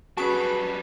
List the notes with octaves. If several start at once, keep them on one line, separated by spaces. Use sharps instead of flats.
F#3 G3 C#4 F#4 G#4 B4 A5 D7